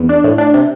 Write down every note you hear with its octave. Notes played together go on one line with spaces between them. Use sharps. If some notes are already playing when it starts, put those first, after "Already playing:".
Already playing: E2
D4
A2
D4
C3